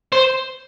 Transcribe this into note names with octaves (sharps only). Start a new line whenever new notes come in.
C5